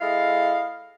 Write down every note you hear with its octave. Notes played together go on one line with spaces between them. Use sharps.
G#3 E4 A4 D#5 F5